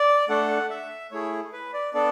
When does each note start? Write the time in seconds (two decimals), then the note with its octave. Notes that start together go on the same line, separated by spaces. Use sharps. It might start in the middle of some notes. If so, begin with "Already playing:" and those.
Already playing: D5
0.29 A3 D4 A4 F#5
0.70 E5
1.11 A3 E4 G#4 C#5
1.53 B4
1.74 D5
1.94 B3 D4 A4 D5